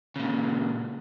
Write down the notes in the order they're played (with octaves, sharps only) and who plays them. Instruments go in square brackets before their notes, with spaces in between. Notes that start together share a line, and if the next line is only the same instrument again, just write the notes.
[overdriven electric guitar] A#2 C#3